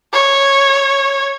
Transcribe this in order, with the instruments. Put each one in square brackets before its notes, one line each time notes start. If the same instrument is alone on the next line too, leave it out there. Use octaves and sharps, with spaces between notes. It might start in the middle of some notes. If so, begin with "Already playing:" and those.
[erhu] C#5